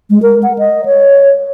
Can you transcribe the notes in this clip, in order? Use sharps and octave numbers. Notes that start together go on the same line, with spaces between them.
G#3
A#4
F#5
D#5
C#5